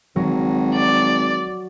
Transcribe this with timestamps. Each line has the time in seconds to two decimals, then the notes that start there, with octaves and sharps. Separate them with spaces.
0.16 G#1 F#3
0.75 D5